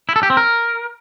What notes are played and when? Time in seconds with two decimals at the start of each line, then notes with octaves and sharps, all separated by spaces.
0.09 E4
0.16 A4
0.23 G4
0.30 C4
0.37 A#4